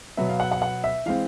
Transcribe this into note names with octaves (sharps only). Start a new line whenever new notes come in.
B2 F#3 B3 E5
F5
F#5
F#5
F#5
E5
E3 G#3 C4 F5